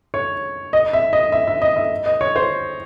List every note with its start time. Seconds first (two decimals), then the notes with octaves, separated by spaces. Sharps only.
0.14 C#5
0.73 D#5
0.93 E5
1.13 D#5
1.32 E5
1.47 E5
1.62 D#5
1.76 E5
2.06 D#5
2.21 C#5
2.36 C5